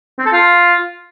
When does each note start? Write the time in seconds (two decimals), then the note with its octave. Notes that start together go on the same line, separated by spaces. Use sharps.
0.19 C4
0.26 A4
0.33 F4